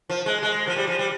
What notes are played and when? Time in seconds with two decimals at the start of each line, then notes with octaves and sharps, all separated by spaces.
0.10 F3
0.26 G#3
0.43 G#3
0.67 F3
0.76 G3
0.87 F3
0.99 G3